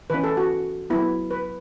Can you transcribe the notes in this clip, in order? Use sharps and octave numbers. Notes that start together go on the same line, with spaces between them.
E3 C#4 B4
A4
F#4
F#3 B3 E4
B4